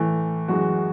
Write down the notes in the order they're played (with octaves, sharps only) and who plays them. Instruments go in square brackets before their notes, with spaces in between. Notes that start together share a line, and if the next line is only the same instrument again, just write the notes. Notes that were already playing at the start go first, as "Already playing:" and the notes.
Already playing: [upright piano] A2 E3 A3
F#2 E3 G#3 F#4